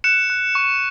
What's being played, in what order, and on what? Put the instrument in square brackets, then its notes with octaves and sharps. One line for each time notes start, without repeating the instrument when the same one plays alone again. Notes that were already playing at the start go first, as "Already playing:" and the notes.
[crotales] F#6 C#7 E7
F#6
C#6